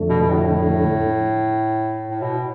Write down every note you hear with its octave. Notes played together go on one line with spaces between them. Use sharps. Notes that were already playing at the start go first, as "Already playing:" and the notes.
Already playing: F2 D3 A3
B2
B2
A2
A2
B2